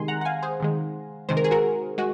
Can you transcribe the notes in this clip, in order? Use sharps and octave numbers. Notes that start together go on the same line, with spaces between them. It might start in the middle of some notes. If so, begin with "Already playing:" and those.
Already playing: C3 D#3 G#3 G#5 C6
F#5 A#5
F#5
F5 G#5
G#4 C5
C3 D#3 G#3
C3 D#3 G#3 C5
A#4
G#4
F#4 A#4
G#3 F#4